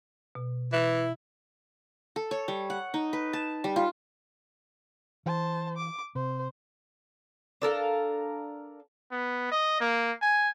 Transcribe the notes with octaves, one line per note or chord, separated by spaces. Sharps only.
B2
E3 E4
A4
C#5
G3
F#5
D#4
B4
A5
G3
F4
E3 C5 A5
D6
C3 C5
D4 A4 A#4 F5
B3
D#5
A#3
G#5